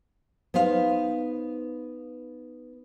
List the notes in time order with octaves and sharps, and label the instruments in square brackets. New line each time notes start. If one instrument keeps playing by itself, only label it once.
[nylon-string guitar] B3 D#4 C5 F5